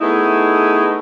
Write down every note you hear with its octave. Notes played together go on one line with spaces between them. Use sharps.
A3 B3 D#4 E4 G#4